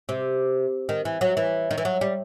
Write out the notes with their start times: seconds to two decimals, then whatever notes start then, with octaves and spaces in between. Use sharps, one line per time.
0.09 C3
0.89 D#3
1.05 E3
1.21 F#3
1.37 E3
1.71 D#3
1.78 E3
1.85 F#3
2.01 G3